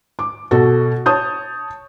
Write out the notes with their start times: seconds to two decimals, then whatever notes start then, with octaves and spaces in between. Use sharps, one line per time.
0.19 D6
0.51 B2 F#4 A4
1.06 C#5 A5 D#6 G6